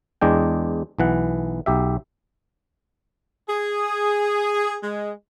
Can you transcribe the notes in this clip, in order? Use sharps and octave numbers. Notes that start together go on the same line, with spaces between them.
E2 G#3 D4 G5
B1 E3 F#5
B1 G4 E5
G#4
G#3